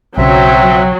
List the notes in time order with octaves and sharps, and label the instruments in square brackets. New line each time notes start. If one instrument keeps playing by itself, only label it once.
[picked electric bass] B1 C#3 [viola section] F#3 [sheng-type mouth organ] C4 E5 [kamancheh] G5